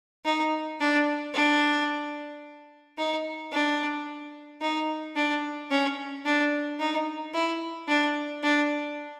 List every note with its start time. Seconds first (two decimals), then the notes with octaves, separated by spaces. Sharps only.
0.25 D#4
0.80 D4
1.34 D4
2.98 D#4
3.52 D4
4.61 D#4
5.15 D4
5.70 C#4
6.25 D4
6.79 D#4
7.34 E4
7.88 D4
8.43 D4